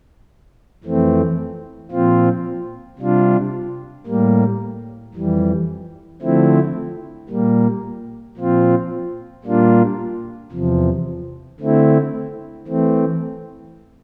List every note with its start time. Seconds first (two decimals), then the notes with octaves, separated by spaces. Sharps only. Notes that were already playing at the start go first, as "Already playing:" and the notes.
0.84 F2 E3 A3 C4
1.91 A#2 F3 C4 F4
2.99 C3 G3 D4 F4
4.06 A2 G3 A#3
5.14 F2 E3 G3
6.22 D3 F3 A3 C4 E4
7.29 A#2 G3 A#3
8.37 A#2 F3 C4 F4
9.44 A#2 G3 A#3 D4 F4
10.52 E2 C3 F3
11.60 D3 A3 C4 E4
12.67 E3 A3 C4